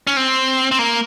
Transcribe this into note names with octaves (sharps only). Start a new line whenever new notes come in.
C#4
C4
C4
A#3